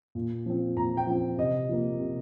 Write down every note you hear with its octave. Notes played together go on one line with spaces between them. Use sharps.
A#2
F3 C4
A#2 A#5
G5
F3 C4
C3 D#5
F3 A#3
C3